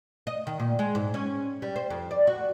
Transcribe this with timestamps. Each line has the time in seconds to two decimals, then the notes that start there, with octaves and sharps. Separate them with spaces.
0.27 D#5
0.47 D#3
0.60 A#2
0.79 G#3
0.95 G#2
1.14 C#4
1.62 G3
1.76 C5
1.90 F2
2.11 D5
2.27 F#4